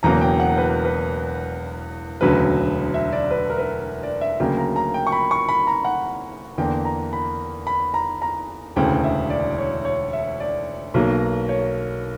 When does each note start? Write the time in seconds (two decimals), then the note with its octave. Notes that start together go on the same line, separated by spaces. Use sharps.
0.03 E1 E2 C#3 F#3 A#3 A#5
0.21 G5
0.40 F#5
0.58 B4
0.85 B4
2.21 E1 D2 C#3 F#3 B4
2.94 E5
3.12 D5
3.31 B4
3.50 A#4
3.58 B4
4.03 D5
4.21 E5
4.40 D2 C#3 F#3 A#3 G5
4.58 A#5
4.76 A#5
4.94 G5
5.07 C#6
5.12 B5
5.31 C#6
5.49 B5
5.67 A#5
5.85 F#5
6.58 E2 D3 A#3 G5
6.85 A#5
7.13 B5
7.67 B5
7.94 A#5
8.22 A#5
8.76 E1 D2 C#3 E3 G5
9.04 E5
9.30 D5
9.58 C#5
9.85 C#5
10.13 E5
10.40 D5
10.94 B1 B2 F#3 A#3
11.49 C#5